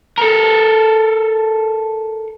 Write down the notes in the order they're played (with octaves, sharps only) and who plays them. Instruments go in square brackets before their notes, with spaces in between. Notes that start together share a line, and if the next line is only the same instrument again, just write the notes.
[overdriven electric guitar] A4 A#4